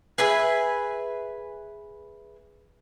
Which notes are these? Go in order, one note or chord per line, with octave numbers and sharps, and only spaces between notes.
G#4 B4 E5 G#5